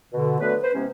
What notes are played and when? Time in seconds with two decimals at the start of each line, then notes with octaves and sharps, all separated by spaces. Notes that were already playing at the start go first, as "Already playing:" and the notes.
0.13 B2 D3
0.40 D3 F#3 A3 B3 B4
0.62 B4 C5
0.74 C3 E3 G#3 B3 C#4